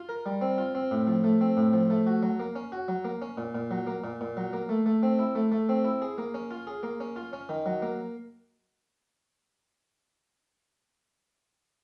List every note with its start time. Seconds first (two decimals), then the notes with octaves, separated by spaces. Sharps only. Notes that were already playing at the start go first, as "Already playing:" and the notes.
Already playing: F4
0.09 A#4
0.26 G3
0.41 C4
0.58 F4
0.75 C4
0.91 A2
1.07 F3
1.24 A3
1.41 C4
1.57 A2
1.73 F3
1.90 A3
2.07 F#4
2.23 F#3
2.40 A#3
2.56 C#4
2.72 F#4
2.88 F#3
3.05 A#3
3.22 C#4
3.38 A#2
3.55 A#2
3.71 F#3
3.87 A#3
4.04 A#2
4.21 A#2
4.37 F#3
4.53 A#3
4.69 A3
4.86 A3
5.03 C4
5.19 E4
5.35 A3
5.52 A3
5.69 C4
5.85 E4
6.02 G#4
6.18 A#3
6.34 C#4
6.51 F4
6.67 G#4
6.83 A#3
7.00 C#4
7.16 F4
7.33 C#4
7.49 D#3
7.66 F#3
7.82 A#3